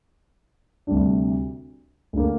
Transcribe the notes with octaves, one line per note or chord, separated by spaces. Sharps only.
D2 C3 G3 D4
D2 D3 A#3